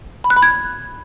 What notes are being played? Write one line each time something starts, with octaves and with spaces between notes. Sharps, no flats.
B5
F#6
B5
G#6